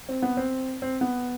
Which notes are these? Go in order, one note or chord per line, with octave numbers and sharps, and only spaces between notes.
C4
B3
C4
C4
B3